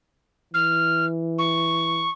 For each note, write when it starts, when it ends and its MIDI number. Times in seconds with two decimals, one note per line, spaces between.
0.54 2.08 52
0.54 1.05 89
1.38 2.09 85